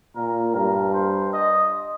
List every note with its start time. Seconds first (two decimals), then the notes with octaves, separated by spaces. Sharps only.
0.16 A#2 A#4
0.55 G2 A#4
0.93 C5
1.33 D#5